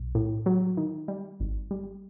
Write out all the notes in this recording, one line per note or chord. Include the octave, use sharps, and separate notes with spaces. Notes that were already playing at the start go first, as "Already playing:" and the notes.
Already playing: B1
A2
F#3
D#3
G3
G#1
G3